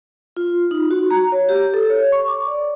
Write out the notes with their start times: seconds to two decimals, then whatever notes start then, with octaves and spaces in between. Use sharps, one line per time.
0.37 F4
0.71 D#4
0.91 F#4
1.11 A#5
1.32 C#5
1.49 G4
1.74 A4
1.90 C#5
2.12 C#6
2.28 D6
2.47 D5